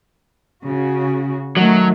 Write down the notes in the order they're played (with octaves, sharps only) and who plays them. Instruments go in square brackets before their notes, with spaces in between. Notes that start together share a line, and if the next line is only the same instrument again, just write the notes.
[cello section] C#3 F#4
[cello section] D#3 A3 [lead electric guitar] F#3